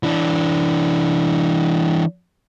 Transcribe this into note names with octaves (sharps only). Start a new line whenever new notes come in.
E3 D4